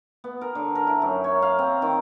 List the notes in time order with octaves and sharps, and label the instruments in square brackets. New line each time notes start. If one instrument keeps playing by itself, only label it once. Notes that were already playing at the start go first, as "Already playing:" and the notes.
[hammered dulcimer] B3
A#4
D3
A#4
E4
F#2
C#5
F5
C4
D#3